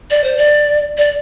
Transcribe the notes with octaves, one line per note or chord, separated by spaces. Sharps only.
D5
C5
D5
D5